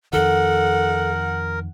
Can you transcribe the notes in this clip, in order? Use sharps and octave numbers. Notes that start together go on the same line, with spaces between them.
F2 D#3 A4 A#4 F#5